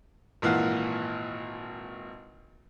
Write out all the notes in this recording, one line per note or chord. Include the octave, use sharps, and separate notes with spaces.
G#1 A#2 E3 F5 F#5